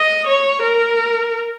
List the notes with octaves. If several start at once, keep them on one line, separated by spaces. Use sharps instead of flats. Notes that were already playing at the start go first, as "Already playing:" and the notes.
Already playing: D#5
C#5
A#4